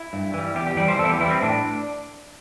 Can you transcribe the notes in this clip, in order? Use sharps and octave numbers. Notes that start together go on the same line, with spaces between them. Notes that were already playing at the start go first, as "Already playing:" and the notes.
Already playing: E4
G2
E3 G3
E2 G4
G4
E3 G3 D5
C5
E2 A4
E4
G4
E3 G3 E4
C4
A2 D4